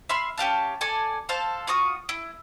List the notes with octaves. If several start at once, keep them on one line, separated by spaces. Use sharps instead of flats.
E5 B5 C6 F6
C#4 G4 F5 A5
A4 D5 G#5
A4 C5 F5 A5
F4 F#4 C#6 D#6
E4